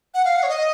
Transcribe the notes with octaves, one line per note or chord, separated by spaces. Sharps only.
F#5
F5
F#5
C#5
D#5